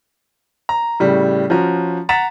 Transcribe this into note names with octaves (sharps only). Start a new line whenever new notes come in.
A#5
A2 C#3 G3
F3 C#4 F#4 A#5
F#5 A#5 A6 B6 E7